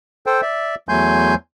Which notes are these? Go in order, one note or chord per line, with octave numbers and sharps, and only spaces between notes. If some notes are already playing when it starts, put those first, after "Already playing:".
A4 C5 G5
D5 E5
E2 F#3 A3 G#5 C6 G6